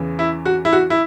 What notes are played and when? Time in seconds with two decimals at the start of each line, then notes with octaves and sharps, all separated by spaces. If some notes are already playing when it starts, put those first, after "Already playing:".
Already playing: E2 C#3 E3
0.19 E4
0.45 F#4
0.65 E4
0.73 F#4
0.90 E4